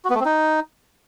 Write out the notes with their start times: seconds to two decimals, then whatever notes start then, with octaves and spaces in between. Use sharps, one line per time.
0.05 F#4
0.10 B3
0.15 A3
0.20 C4
0.25 D#4